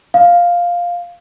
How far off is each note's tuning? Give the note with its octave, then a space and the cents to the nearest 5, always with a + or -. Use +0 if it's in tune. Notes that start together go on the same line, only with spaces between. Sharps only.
F5 +5